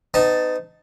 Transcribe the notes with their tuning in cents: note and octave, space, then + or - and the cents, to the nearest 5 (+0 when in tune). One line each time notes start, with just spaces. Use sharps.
B3 +45 D#4 -10 A5 +5